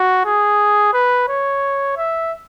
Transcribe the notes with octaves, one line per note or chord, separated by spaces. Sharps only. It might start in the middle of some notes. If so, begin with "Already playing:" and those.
Already playing: F#4
G#4
B4
C#5
E5